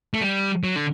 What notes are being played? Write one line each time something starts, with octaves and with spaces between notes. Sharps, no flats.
A3
G3
F#3
D3